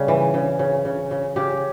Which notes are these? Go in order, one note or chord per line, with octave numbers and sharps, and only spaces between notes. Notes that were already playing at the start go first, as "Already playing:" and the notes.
Already playing: C#3 G3
E3
C#3
C#3
C#3
C#3
C#3 G4